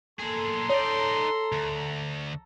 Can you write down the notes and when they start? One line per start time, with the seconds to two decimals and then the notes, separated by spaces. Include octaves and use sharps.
0.19 A#2 G#4 A4 A#5 C6
0.70 D#4 C#5 D5
1.52 D2